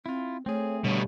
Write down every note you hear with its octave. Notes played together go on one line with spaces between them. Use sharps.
C4 E4 F4
A3 C4 G#4 C#5
B2 D3 G3 A3 C#5